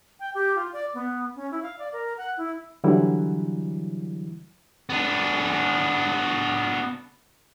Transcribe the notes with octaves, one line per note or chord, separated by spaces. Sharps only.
G5
G4
F4
D5
B3
C#4
E4
F5
D5
A#4
F#5
E4
D3 E3 F#3 G3 E4
B3 D4